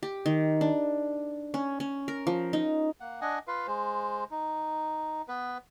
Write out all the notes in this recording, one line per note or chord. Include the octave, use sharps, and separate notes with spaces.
G4
D#3
D4
C#4
C#4
A#4
F3
D#4
A#3 F#5
D4 D#5 F#5 G#5
F4 B4 F5
G#3 C5
D#4
B3 B4